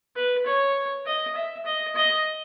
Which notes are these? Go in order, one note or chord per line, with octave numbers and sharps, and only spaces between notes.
B4
C#5
D#5
E5
D#5
D#5